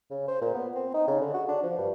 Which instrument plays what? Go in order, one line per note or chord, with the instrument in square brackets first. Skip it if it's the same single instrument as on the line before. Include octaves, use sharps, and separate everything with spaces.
[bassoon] C#3
C5
A#2
B3
C4
D#4
C#3
D3
F#4
D4
F3
G2